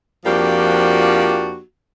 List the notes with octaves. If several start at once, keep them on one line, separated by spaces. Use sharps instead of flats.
F2 F3 A#3 D4 F#4 G4